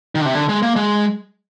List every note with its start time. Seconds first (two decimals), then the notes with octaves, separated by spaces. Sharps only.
0.15 D#3
0.21 D3
0.26 C3
0.35 D3
0.49 G#3
0.62 A#3
0.76 G#3